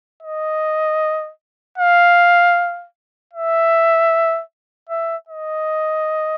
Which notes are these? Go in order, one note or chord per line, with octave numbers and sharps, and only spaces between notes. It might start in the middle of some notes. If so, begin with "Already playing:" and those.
D#5
F5
E5
E5
D#5